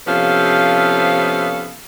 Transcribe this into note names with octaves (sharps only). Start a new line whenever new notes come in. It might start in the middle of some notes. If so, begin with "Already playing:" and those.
C3 F3 B3 C#4 A4 F5